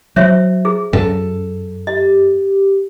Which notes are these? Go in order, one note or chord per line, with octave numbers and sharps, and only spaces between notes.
F#3 C5 C#5 E5
G#4
F#2 A4
G4 D#5